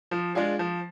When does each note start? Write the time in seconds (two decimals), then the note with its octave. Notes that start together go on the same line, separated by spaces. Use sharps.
0.11 F3
0.35 G#3 D4 F4 G#4
0.59 F3